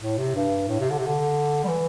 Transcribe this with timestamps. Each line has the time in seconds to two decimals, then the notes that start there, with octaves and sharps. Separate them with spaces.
0.02 A2
0.18 C3
0.35 G2
0.69 A2
0.80 C3
0.91 D3
0.98 C3
1.07 D3
1.64 G3
1.68 E3